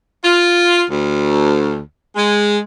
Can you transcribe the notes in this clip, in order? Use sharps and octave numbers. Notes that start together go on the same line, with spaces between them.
F4
D2
G#3